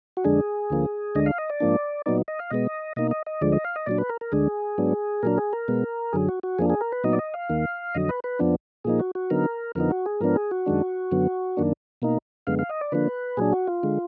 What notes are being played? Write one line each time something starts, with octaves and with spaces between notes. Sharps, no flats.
F#4
F2 D3 G#3 D4 G#4
D2 D3 F3 A#3
D2 D3 G#3 D4 D#5
F5
D#5
D5
G#2 F3 A#3 D4
A#2 F#3 B3 D#4 D5
D#5
F5
B2 G#3 B3 D#5
B2 A#3 D#4 D#5
D#5
D#5
D2 D3 F3 G#3 D5
D#5
F5
D#5
A#2 F#3 D4 D5
B4
A#4
A#4
D2 D3 G#3 D4 G#4
G#2 F#3 B3 D4
A#2 F#3 D4 A#4
G#4
A#4
B2 G#3 B3
F#2 D3 F#3 G#4
F#4
F#4
F2 F3 A#3 D4 G#4
G#4
A#4
B4
A#2 F#3 B3 D#4 D#5
D5
D#5
F5
D#2 D#3 A#3
F2 D3 F#3 D#5
B4
B4
F2 F3 B3 D4
A#2 F3 A#3 D#4 G#4
F#4
F#4
D3 F#3 B3 D#4 A#4
F2 D3 F3 B3 D#4 A#4
F#4
G#4
G#2 F3 B3 D4 A#4
G#4
F#4
F#2 D#3 G#3 D4
F#2 D3 F#3 B3
F#2 D#3 A#3 D4
B2 A#3 D#4
F#2 D3 G#3 B3 F5
F5
D#5
D5
D3 F3 A#3 D4 B4
A#2 F#3 D4 G#4
F#4
F4
D3 G#3